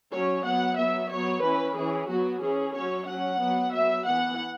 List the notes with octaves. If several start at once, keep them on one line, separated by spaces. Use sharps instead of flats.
F#3 C#4 C#5
F#3 B3 F#5
F#3 B3 E5
F#3 B3 C#5
E3 C#4 B4
E3 C#4 G#4
F#3 B3 F#4
E3 C#4 G#4
F#3 C#4 C#5
F#3 C#4 F#5
F#3 B3
F#3 B3 E5
E3 B3 F#5